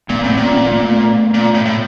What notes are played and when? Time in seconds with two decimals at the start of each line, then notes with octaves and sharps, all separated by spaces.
0.09 A#2 A3 B3
0.24 A2 A#3 C4
0.37 A#2 B3 C#4
0.56 A#3 C4
0.72 A3 B3
1.34 A#2
1.54 A2
1.65 A2